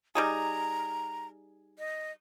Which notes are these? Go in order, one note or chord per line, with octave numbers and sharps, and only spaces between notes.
G3 D#4 G#4 A#5
D#5